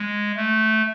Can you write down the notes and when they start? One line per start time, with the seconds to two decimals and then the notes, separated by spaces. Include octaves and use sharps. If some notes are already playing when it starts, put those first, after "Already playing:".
Already playing: G#3
0.36 A3